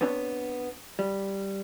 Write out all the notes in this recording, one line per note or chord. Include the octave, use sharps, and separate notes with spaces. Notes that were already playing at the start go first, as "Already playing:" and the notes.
B3 C4 D4 B4 C#5
G3